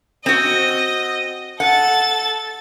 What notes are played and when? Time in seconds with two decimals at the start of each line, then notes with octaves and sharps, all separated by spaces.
0.26 C4 F#4 D#5
1.60 A4 F#5 A6